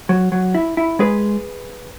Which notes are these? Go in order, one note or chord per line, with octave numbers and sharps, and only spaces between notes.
F#3
F#3
E4
E4
G#3 G#4 B4